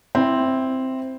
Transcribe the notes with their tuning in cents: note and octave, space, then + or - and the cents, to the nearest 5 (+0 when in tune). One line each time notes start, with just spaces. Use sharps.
C4 +0 E4 +0